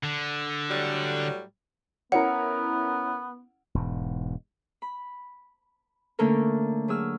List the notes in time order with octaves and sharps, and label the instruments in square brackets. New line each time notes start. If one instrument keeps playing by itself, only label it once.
[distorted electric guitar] D3
[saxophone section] A2 F#3 G3
[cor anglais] B3 [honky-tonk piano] C#4 E4 A#4 [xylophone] F#5
[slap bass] E1 G#2
[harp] B5
D3 A3 A#3 C#4 A4 A#4
F#3 G#4 E6 F6